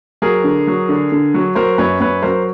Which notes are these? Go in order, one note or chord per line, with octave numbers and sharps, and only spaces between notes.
F#3 G#4 A#4
D3
F#3
D3
D3
F#3
F#3 A#4 C5
F#2 B4 C#5
F#2 B4 C#5
F#3 A#4 C5